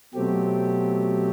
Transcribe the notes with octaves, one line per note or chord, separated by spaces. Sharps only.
B2 F#3 A3 C4 G4